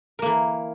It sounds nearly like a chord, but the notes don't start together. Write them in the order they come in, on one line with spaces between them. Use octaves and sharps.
A#4 A#3 E3